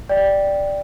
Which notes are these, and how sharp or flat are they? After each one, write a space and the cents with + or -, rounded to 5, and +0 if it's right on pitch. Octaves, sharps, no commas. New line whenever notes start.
D5 +0 G5 +0